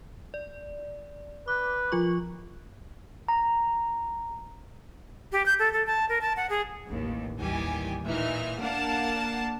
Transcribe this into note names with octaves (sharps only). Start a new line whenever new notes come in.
D5
B4 D6
F3 F4 C#6
A#5
G4
G6
A4
A4
A5
A#4
A5
F#5
G#4
A1 D#2
D#2 D#3 E3 G3 G4 G#5
A#2 E3 D#4 E5 F6
A#3 D4 A#4 F5 F#5 A5